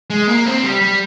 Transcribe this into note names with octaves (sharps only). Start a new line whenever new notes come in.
G#3
A#3
C4
G3
G3